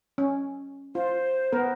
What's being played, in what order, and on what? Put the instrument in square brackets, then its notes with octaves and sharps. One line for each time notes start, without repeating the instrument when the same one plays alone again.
[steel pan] C#4
[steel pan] F4 [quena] C5
[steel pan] B3 A#4